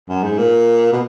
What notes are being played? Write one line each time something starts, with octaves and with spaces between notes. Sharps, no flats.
F#2
G#2
A#2
B2